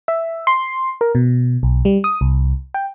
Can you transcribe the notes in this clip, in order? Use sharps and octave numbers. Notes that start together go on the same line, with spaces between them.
E5
C6
A#4
B2
B1
G3
D#6
C2
G5